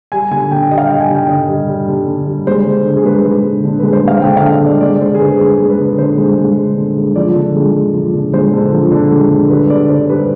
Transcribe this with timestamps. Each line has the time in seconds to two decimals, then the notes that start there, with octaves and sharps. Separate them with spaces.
0.12 G3 G#5
0.31 D3 G#5
0.51 D3 G5
0.71 G3 D#5
0.78 F5
0.86 G3 G5
1.00 G#5
1.09 D3
1.15 G5
1.29 D3 D#5
1.49 G3
1.69 G3
1.88 D3
2.07 D3
2.27 G3
2.47 G#3 C5
2.66 D3
2.85 D3
2.96 G#4
3.05 G#3 B4
3.25 G#3
3.45 D3
3.65 D3
3.79 G#3 B4
3.93 C5
4.04 G#3 F5
4.22 D3 G5
4.37 D3 F5
4.51 D#5
4.62 G#3 D5
4.81 G#3 D5
5.01 D3 C5
5.14 G#4
5.20 D3 B4
5.40 G#3 G#4
5.59 G#3
5.69 B4
5.80 D3
5.98 D3 C5
6.18 G#3
6.38 G#3
6.57 D3
6.77 D3
6.97 G#3
7.16 F3 D5
7.36 D3
7.55 G#3
7.74 D3
7.94 F3
8.13 D3
8.33 G#3 C5
8.53 D3
8.73 F3
8.91 D3
9.12 G#3
9.31 D3
9.50 G3 B4
9.69 D3 D5
9.89 D3 C5
10.09 G3 B4